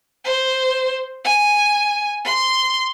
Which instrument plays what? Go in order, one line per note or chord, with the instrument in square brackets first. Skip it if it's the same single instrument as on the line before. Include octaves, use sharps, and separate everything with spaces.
[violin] C5
G#5
C6